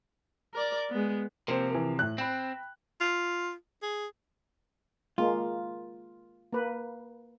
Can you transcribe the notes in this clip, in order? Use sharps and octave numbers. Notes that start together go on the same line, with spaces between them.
A#4 D5
G#3 B3
C3 F3 A#3 C4
E3 A#4
A2 F#6
C4 G5 B5
F4
G#4
G#3 A#3 F4
A#3 B4